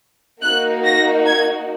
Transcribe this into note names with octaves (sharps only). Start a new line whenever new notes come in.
A#3 D#4 F#4 F#6
A#6
G#6